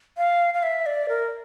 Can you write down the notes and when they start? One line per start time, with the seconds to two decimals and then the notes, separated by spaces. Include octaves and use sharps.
0.17 F5
0.54 F5
0.63 E5
0.86 D5
1.09 A#4